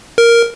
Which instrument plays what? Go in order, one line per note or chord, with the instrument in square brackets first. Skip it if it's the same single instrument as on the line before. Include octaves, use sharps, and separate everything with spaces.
[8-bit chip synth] A#4